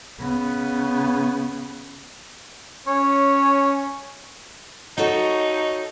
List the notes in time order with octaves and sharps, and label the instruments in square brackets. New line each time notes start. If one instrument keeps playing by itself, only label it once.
[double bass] C#3 B3
[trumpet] C#4 [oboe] C#5
[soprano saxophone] D#4 [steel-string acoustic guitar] F#4 A4 C#5